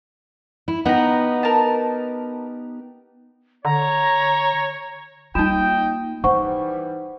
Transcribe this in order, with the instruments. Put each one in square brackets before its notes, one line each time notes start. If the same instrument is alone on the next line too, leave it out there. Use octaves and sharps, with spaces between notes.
[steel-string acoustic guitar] E4
[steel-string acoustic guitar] B3 D#4 G4 [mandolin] F#5 A#5
[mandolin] A#4 A5
[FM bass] D3 [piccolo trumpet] C#5 [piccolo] A#5
[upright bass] G3 A#3 [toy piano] D#4 F4 [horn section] D#5 G5 [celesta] E7
[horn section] E3 G3 [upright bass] D#4 [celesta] C5 F#5 [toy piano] C#6